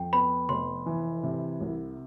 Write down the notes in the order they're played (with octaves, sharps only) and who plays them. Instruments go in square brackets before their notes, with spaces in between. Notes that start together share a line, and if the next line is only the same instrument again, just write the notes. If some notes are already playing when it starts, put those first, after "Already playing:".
Already playing: [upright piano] F2 [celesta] G5
[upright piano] B3 [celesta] B5
[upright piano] F1 [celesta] C6
[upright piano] E3
C3
C2